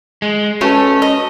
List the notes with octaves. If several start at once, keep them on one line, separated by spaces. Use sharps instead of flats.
G#3
A3 C#4 F#4 B4 A5
D#5